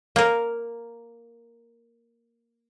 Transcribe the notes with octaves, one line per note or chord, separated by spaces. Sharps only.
A#3 A#4